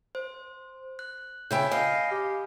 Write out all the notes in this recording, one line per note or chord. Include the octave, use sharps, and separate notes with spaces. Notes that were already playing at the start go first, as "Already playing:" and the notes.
C5
F#6
C#3 E5 G5 G#5 B5 G6
D#5 F5
G4